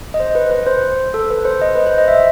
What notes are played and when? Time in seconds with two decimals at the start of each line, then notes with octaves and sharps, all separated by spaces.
0.14 D#5
0.20 C5
0.35 B4
0.51 B4
0.67 C5
1.14 A4
1.31 B4
1.45 C5
1.61 D#5
1.75 B4
1.87 C5
1.98 D#5
2.08 E5